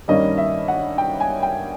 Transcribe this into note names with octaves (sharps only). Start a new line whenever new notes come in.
G2 D#3 G3 A#3 C#4 D#5
E5
F#5
G5
G#5
G5